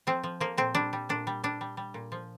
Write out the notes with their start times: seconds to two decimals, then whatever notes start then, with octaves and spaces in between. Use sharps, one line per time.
0.07 F3 C4
0.24 F3
0.40 F3 A#3
0.58 A#2 C4
0.75 G3 D4
0.93 G3
1.09 A#2 D4
1.27 G3
1.44 G3 D4
1.61 G3
1.77 G3
1.94 A#2
2.12 F3